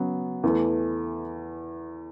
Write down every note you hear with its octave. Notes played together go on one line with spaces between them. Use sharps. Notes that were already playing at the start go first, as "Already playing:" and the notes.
Already playing: C#3 F#3 B3
E2 E3 A3